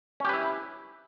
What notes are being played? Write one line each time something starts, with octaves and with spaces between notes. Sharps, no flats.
C#4 E4 G4 B4